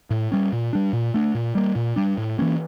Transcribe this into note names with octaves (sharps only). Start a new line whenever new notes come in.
A2
G3 C#4
A#2
G3 D4
A#2
A3 D4
A#2
G3 A#3
A#2
G3 D4
A2
E3 A#3 C#4